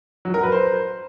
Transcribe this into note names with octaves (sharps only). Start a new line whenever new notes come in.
F#3
A#4
B4
C5